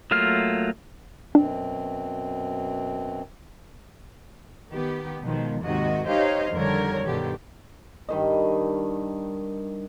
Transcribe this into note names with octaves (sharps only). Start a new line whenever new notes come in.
F#3 A3 A#3 F4 F6
F#2 B2 C4 D4
D#3 B3 G4
B2 D#3 F3 G#3
D#2 G#2 C3 D#3 F#4 D#5
D#4 G4 C5 C#5 D#5 F5
F2 D3 D#3 G3 A#4 C#5
G2 B2 D3 D#3 G4
G2 D#3 D#5